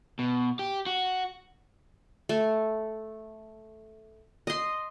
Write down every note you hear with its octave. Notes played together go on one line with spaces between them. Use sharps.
B2
G4
F#4
A3
D#5 C6